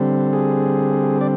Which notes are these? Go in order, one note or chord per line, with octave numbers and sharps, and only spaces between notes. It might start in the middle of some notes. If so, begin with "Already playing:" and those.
Already playing: D3 G3 C4
G#4
D5